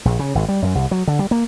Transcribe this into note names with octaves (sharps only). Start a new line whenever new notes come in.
A#1
C#3
G#1
G3
F#2
C2
F#3
D3
G3
A#3